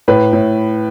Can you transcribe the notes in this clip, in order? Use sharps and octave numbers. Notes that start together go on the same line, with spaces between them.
A2 B4
A2